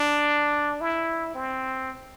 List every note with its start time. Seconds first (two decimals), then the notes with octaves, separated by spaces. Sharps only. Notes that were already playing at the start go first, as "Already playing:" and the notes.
Already playing: D4
0.81 E4
1.34 C4